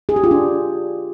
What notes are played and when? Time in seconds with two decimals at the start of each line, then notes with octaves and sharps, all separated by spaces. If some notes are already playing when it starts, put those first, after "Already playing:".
0.09 G#4
0.16 G4
0.24 F4
0.31 D4